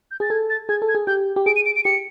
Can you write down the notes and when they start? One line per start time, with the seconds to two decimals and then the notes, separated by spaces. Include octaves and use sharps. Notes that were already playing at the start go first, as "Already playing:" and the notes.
0.11 G6
0.20 G#4 A6
0.30 A4 G#6
0.50 A6
0.69 G#4 G#6
0.82 A4
0.88 G#6
0.95 G#4
1.07 G4 G6
1.36 G4
1.46 G#4 D7
1.56 D#7
1.66 D7
1.76 D7
1.85 G4 C#7